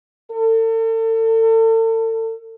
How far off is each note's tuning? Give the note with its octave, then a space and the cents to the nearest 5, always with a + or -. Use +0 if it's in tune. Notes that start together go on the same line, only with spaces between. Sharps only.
A4 +40